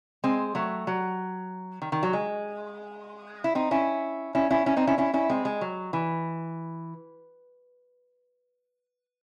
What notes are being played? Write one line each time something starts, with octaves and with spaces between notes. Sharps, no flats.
G#3 C4
F#3 A3
F#3
D#3
D#3
F#3
G#3
E4
C4 D#4
C#4 E4
C#4 E4
C#4 E4
C#4 E4
C4 D#4
C#4 E4
C#4 E4
C#4 E4
G#3 C4
G#3
F#3
E3